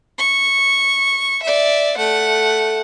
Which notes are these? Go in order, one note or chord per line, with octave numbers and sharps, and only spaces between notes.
C#6
D5 E5
A3 F#5